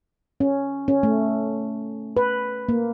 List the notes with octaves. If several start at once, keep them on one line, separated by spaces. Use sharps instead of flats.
C#4
C#4
A3
B4
A#3